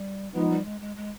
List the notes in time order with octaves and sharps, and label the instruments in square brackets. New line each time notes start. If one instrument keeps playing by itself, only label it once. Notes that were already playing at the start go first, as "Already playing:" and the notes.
Already playing: [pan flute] G3
[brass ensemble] F3 B3 D#4 [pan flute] G#3
[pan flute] G3
G#3
G#3
G#3